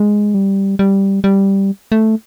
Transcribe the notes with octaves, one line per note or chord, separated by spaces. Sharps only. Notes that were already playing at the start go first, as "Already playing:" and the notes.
Already playing: G#3
G3
G3
G3
A3